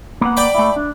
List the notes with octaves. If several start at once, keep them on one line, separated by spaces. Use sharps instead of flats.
A#3 B3 F#5
D5 G5 B5
A3 E4
D4